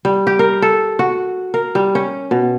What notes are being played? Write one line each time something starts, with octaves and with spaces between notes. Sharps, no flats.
G3
G4
A#4
A4
F#4
A#4
G3
C#4
B2